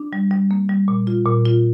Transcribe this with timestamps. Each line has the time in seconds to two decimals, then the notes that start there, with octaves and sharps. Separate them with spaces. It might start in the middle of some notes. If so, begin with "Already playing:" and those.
Already playing: D4
0.13 G3
0.31 G3
0.51 A#3
0.69 G3
0.88 A#2
1.07 F4
1.26 A#2
1.46 F4